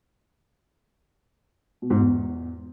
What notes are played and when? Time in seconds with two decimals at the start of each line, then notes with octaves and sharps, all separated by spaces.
1.82 B2
1.90 G#2
1.99 E2